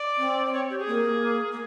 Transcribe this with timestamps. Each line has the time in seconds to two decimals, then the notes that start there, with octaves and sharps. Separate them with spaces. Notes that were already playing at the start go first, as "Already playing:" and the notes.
Already playing: D5
0.17 C4
0.46 D5
0.53 C#5
0.70 G4
0.79 G#4
0.87 A#3
1.51 A#3